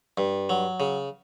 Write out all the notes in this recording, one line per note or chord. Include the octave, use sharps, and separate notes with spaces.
G2
F#3
C#3